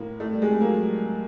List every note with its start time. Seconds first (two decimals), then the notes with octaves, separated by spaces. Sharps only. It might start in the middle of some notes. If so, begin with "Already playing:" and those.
Already playing: A2 A#3
0.20 A2 A3
0.33 G3
0.42 G#3
0.51 A3
0.61 F#3 A#3